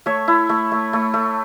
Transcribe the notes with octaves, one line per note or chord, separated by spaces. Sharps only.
A3 C#5 E5
E4
A3
A3
A3
A3